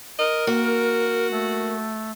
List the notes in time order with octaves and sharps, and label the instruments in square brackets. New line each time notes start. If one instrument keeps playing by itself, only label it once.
[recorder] A#4 [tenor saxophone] D#5
[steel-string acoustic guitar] A#3 [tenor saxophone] F#4
[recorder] A3